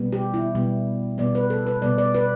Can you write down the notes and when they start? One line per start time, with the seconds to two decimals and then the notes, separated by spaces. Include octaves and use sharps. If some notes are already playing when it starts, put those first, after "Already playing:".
Already playing: B2 G3 B3
0.13 G4
0.34 E4
0.55 B2 G3 B3
1.18 B2 G3 B3 D5
1.35 B4
1.50 A4
1.66 B4
1.82 B2 G3 B3 D5
1.98 D5
2.14 B4